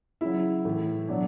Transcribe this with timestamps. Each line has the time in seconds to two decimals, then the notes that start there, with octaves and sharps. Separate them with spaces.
0.21 C#3 F#3 E4
0.65 A2 E3
1.08 B2 F#3 D4